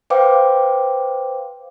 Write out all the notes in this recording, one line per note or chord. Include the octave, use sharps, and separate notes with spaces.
B4 C5 F5 G5 D6